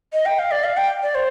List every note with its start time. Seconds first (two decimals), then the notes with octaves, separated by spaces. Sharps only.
0.13 D#5
0.25 G5
0.39 F5
0.51 D5
0.64 F5
0.77 G5
1.02 D5
1.15 C5